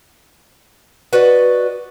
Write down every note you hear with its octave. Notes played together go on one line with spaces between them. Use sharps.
F#4 B4 D5 D#5